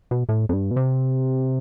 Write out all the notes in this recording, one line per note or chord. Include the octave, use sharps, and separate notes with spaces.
B2
A2
F2
G2
B2
C3